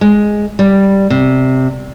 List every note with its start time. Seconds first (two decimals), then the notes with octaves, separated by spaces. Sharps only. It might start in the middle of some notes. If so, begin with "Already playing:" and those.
0.01 G#3
0.59 G3
1.10 C3